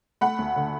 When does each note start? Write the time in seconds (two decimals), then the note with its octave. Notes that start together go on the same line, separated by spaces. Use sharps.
0.21 A3 F#5 B5
0.39 D2
0.56 D3